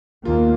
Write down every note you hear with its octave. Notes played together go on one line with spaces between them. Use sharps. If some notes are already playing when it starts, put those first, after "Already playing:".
D#2 A#3 F4